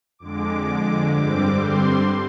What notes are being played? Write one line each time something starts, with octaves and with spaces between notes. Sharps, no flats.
F2 D3 G#3 D6
G2 D3 G3 C4 D6
C6